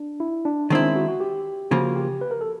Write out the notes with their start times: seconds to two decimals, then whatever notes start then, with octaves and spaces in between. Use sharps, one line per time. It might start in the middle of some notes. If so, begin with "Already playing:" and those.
Already playing: D4
0.20 E4
0.45 D4
0.70 D#3 G#3 C4 D4 E4
0.83 C#4
0.96 F#4
1.08 F#4
1.20 G4
1.71 C#3 F3 A#3 F#4
1.96 G4
2.21 B4
2.31 A#4
2.41 A4